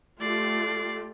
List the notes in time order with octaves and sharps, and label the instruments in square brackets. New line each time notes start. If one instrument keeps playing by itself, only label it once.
[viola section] A3 F4 G4 [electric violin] D5 C7